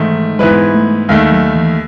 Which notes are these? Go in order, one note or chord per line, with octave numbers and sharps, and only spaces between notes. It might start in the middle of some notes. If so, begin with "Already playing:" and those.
Already playing: G#2 D#3 E3 A3
G#2 E3 G#3 B3 E4 B4
A3
D#2 D#3 G#3 A3
F#3
E3